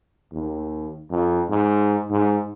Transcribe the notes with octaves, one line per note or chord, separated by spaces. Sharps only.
D#2
F2
G#2
G#2